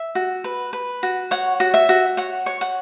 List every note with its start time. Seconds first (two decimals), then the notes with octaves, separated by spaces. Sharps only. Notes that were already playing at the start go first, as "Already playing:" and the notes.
Already playing: E5
0.15 F#4
0.44 B4
0.73 B4
1.03 F#4
1.31 C#5 F#5
1.60 F#4
1.74 E5
1.89 F#4
2.17 C#5 F#5
2.46 C#5
2.61 F#5